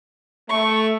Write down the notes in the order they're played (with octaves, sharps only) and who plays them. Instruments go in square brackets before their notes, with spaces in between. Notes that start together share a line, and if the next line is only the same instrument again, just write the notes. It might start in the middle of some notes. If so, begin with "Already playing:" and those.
[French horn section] A3 [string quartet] C#6